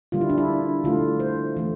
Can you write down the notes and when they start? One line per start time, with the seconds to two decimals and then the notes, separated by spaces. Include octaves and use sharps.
0.12 D3 G3 A#3 F4
0.21 E4
0.29 D4
0.38 E4
0.84 D3 A3 F4
1.20 C5
1.57 E3 A3